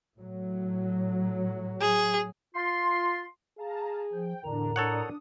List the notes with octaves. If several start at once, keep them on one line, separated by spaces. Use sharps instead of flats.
A2 F#3
G#4
F4 C6
G#4 F5 A5 A#5
F3 G5
E2 A2 D3 D4 A#4 A#5
D4 A4 C#5 F#5 D#6